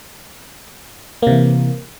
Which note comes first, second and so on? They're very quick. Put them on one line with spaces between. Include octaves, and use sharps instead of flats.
A#3 C3 E3